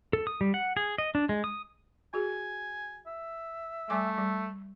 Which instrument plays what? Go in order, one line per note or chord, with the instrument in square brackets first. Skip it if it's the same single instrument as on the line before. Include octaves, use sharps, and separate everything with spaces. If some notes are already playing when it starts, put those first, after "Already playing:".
[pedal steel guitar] A4
D#6
G3
F#5
G#4
D#5
D4
G#3
D#6
[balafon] F#4 G#4 [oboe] G#5
[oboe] E5
[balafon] G3 G#5 D6 [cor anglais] A3
[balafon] G3